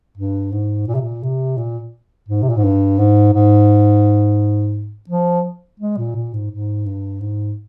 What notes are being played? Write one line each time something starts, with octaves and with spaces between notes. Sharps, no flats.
G2
G#2
A#2
C3
A#2
C3
A#2
G#2
C3
A#2
G#2
G2
G#2
G#2
F3
G#3
A#2
A#2
G#2
G#2
G2
G#2